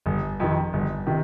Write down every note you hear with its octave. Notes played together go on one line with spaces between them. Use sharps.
G1
F2 C3 D#3
G1
C3 D#3